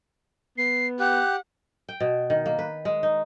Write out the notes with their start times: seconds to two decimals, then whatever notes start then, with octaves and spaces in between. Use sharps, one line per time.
0.58 B3 C7
1.00 G4 F#5 F#6
1.89 G5
2.00 B2
2.30 D#3
2.46 A#3
2.59 B4
2.85 G#3
3.03 D#4